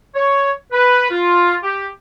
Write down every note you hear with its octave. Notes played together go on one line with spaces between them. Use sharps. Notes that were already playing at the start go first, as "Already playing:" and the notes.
C#5
B4
F4
G4